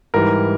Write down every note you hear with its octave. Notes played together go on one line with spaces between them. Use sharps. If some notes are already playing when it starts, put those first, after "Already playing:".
G#2 E3 G3 A#4